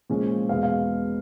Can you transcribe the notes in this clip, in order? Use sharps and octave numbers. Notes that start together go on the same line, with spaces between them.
A#2 F3 G#3 C#4
E2 B2 G#3 B3 F5
F5